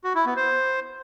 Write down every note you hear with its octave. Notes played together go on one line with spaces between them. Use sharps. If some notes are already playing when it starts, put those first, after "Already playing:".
F#4
E4
B3
C5